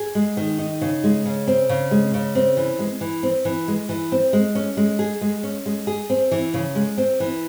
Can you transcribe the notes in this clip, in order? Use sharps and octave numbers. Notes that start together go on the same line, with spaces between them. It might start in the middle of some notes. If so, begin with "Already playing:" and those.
Already playing: G#4
G#3
D#3
D#4
C#3
G#3
C#3
C4
C#3
G#3
C#3
C4
E3
G#3
E3
C4
E3
G#3
E3
C4
G#3
C#4
G#3
G#4
G#3
C#4
G#3
G#4
C4
E3
C#3
G#3
C4
E3